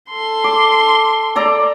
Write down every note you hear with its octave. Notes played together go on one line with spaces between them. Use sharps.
A4 C6
D6
A4 D5 A#5